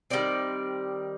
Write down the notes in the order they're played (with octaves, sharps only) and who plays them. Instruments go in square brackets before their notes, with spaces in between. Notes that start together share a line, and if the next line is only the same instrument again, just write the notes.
[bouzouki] D#3 G3 C4 D5